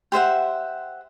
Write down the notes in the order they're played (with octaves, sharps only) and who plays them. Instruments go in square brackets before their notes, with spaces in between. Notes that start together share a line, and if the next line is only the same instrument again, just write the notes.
[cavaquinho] G4 C5 E5 F#5